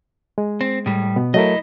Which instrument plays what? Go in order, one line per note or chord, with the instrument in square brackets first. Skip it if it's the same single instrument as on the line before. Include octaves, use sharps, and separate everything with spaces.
[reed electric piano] G#3
[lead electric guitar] C4
A2 G3
[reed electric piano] B2 B3
[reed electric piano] F#3 A3 A#4 [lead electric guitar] E4 D#5